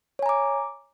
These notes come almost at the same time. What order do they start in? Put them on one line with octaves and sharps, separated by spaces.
C#5 G#5 A#5 D6